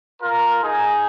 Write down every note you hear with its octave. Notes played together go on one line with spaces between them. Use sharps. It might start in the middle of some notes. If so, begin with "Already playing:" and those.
F4 A#4
D#4 G#4